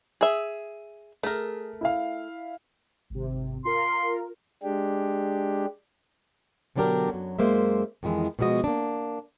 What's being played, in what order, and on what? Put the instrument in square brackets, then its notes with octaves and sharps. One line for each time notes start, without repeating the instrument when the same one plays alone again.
[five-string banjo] G#4 E5
[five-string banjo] A3 A#4 [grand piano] G#4
[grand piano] E4 E5 F5
[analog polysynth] G#1 C3
[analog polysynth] F4 A#4 [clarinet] C6
[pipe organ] G#3 D4 G4
[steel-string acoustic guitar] B2 D3 F#3 D4 G4 A#4
F#2 F#3
F#2 G#3 A#3 C5 E5
F2 D#3 E3 G#3
B2 F3 G#3 F#4 D#5
A#3 D4